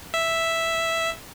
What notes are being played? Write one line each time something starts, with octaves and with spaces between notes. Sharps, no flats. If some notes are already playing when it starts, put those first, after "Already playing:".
E5